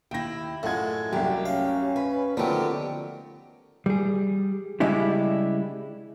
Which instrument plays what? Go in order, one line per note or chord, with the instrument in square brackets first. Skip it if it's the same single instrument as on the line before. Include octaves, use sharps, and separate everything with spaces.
[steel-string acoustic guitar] D#2 E4 [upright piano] G5 A#6
[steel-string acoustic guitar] F#2 [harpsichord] A2 G#3 [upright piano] F4 F#5 G#6
[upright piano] C2 F#2 [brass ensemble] A#3 D4 F#4 [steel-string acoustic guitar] G4
[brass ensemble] C#4 [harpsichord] F5
[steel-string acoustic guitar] B4
[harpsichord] D3 F#3 [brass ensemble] D#3 [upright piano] F3 A3 A#4 [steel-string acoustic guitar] B3 G4
[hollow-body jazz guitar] G3 G#4
C#3 G3 G#3 D4 E4 G4